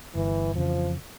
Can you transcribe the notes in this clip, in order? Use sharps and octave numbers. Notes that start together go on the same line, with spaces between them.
G1 E3
F2 C#3 E3 F3